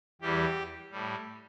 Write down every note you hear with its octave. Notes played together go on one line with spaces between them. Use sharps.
E2 E3 G3 G4
A2 G3